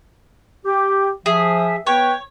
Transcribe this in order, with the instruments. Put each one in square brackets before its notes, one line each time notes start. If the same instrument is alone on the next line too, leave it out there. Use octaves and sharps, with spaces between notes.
[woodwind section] G4
[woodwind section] F3 E5 [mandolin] G#4
[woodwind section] B3 B4 G5 [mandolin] C#5